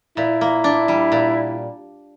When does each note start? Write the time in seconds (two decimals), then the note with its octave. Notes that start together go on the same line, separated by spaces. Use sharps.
0.17 A#2 E4
0.41 A#3
0.64 D4
0.88 G3
1.12 A#2